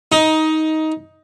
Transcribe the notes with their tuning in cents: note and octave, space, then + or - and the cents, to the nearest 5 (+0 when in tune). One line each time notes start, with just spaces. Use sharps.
D#4 +15